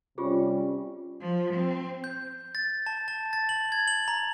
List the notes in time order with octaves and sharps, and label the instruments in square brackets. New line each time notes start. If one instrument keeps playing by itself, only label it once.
[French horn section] C3 G3 C#4 [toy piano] F4 G4 G#4
[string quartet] F3
C4
[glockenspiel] G6
A6
A5
A5
A6
F#7
G#6
F#7
A#5